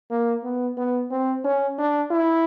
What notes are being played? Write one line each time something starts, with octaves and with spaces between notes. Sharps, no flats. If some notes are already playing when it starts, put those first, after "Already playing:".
A#3
B3
B3
C4
C#4
D4
E4